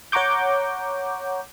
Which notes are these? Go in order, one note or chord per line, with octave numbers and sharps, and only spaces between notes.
C#5 F#5 A#5 C#6 D6 G6